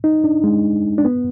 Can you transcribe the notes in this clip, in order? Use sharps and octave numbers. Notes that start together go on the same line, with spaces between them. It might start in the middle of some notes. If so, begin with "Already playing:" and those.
D#4
D4
G#3
D4
B3